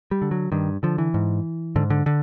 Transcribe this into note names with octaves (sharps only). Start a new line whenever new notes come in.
G3
D3
F#3
G2 D#3
D3 F3
E3
G#2
G#2 D3
D3
D3